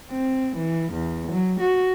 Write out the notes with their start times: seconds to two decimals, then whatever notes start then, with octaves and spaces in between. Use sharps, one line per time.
0.11 C4
0.56 E3
0.93 E2
1.32 F#3
1.60 F#4